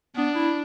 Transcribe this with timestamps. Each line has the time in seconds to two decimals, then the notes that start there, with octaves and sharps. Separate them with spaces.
0.16 B3 D4
0.35 E4